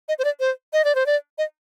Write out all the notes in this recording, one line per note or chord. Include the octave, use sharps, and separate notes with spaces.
D#5
C5
D5
C5
D#5
D5
C5
D5
D#5